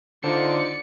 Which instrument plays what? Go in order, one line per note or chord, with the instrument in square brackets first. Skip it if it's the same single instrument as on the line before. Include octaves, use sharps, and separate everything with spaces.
[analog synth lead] D3 [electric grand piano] D#4 F4 C5 [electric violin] D5 C#7